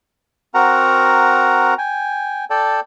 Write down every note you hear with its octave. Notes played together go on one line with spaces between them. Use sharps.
C4 F#4 A#4 F#5 A#5
G5 G#5
A4 D5 G5 A5